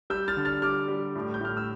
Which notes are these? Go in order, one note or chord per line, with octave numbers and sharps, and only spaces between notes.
G3 E6 G6
F6 A6
D3
F6 A6
G3 D6 F6
G3
A2
G6
A2 F6
E6